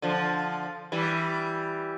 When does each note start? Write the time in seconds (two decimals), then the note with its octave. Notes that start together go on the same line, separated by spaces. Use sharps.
0.02 D3 F3
0.92 E3 G3